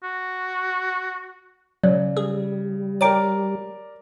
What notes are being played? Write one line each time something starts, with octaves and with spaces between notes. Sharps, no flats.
F#4
C#3 F#3 D5
G3 G#4
A#4 C#5 D5 G5 A#5 D6 D7